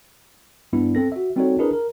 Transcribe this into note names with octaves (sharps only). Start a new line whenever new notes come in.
G2 G3 B3 D4 E4
C4 A4 A#6
F#4 E5
G3 C4 D#4 F#4 A4 C#5
D4 E4 G#4 A#4 B4
A#4